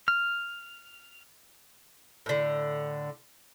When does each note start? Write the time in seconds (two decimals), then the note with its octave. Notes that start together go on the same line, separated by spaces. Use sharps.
0.08 F6
2.26 A2 D3